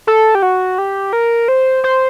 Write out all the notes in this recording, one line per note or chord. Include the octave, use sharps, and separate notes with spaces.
A4
G4
F#4
G4
A#4
C5
C5